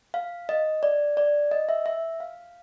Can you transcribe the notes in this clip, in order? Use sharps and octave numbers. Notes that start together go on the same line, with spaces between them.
F5
D#5
D5
D5
D#5
E5
E5
F5